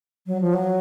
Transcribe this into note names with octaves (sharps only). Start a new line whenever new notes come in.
F#3
F3
F#3